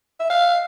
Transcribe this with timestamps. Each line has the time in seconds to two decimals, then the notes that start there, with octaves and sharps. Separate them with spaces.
0.20 E5
0.30 F5